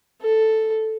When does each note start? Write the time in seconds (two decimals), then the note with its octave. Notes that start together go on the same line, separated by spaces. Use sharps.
0.22 A4